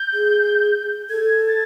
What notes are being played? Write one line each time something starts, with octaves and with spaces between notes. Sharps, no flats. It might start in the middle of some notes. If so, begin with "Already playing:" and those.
Already playing: G6
G#4
A4 G#6
A6